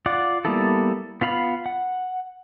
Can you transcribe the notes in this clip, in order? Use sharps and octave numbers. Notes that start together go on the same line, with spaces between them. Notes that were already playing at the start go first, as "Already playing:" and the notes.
F4 D5 F#5
G3 A#3 B3 E4 A4
B3 F4 F5 B5 F6
F#5